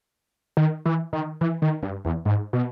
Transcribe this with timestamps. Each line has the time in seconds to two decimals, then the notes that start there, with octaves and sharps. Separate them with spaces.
0.57 D#3
0.86 E3
1.13 D#3
1.41 E3
1.62 D#3
1.83 G2
2.05 E2
2.26 G#2
2.53 B2